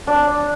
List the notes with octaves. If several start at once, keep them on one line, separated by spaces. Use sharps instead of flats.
D4